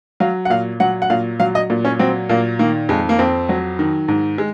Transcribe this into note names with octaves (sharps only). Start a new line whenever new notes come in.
F#3 F5
F#5
A#2 F5
F#3 F#5
F#5
A#2 F5
F#3 F5
D#5
A#2
C#4
F#3 C4
A#2 A#3
D#3 A#3
F2 G#3
A#3
F2 C4
F#3
D#3
G#2
G#3